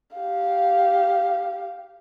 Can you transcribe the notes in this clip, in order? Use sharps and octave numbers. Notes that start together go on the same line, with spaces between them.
G4 F5